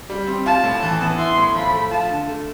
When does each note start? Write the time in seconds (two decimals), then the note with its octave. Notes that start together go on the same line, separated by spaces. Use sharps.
0.10 G3
0.27 C4
0.46 F4 A5
0.64 A2
0.83 E3
1.01 B3
1.18 E4 C6
1.37 A2
1.55 F3 B5
1.72 A3
1.91 F4 A5
2.09 D3
2.27 A3